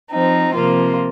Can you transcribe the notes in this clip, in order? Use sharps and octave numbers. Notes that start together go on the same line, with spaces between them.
F3 C4 D#4
C3 F3 A#3 F4